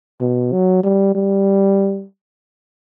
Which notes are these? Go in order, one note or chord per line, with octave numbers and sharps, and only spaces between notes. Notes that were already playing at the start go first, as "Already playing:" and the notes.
B2
F#3
G3
G3